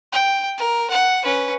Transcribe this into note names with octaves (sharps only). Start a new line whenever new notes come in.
G5
A#4
F#5
C#4 B4